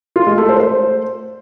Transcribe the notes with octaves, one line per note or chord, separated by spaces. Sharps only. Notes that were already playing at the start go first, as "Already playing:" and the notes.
F4
G#3
A3
C5
C5